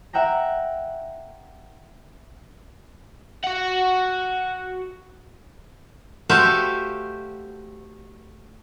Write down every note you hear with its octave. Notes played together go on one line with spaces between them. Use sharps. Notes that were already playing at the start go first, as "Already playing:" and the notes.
E5 F#5 G5 A#5
F#4 F#5
A3 F#4 G4 C5 E5 F5